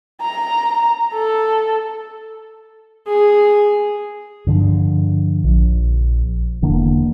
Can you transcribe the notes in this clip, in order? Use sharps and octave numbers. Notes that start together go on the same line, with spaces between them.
A#5
A4
G#4
G2 D3 F3
A#1
E1 D3 E3 A#3